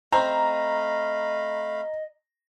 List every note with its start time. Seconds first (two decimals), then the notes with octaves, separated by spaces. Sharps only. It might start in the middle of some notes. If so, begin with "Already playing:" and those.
0.12 A3 C4 D#5 F5 A#5 B5